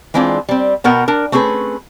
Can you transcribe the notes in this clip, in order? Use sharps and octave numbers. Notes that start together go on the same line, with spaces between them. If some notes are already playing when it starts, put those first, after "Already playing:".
E3 G#3 C4 D4 F4
G3 C4
B2 B3 A#4 F#5 G5
D4 A#4
A3 C4 C#4 G#4 B4